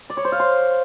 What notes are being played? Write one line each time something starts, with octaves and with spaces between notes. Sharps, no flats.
D5
C#5
C5
F5
C6